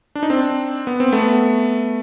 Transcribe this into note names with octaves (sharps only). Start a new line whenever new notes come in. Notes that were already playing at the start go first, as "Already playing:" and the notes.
D4
D#4
C4 D4
B3
C4
A3 B3